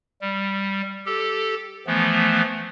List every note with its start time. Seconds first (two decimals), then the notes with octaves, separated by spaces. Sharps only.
0.22 G3
1.06 G4 A4
1.87 E3 F3 A3 B3